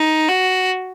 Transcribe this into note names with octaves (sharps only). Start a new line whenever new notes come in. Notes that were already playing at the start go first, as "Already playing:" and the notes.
Already playing: D#4
F#4